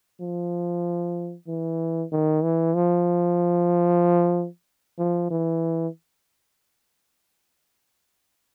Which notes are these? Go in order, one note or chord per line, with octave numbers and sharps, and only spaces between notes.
F3
E3
D#3
E3
F3
F3
E3